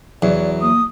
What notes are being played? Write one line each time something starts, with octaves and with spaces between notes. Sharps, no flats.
E2 F#3 E4 F#4 D5
A#3 D#6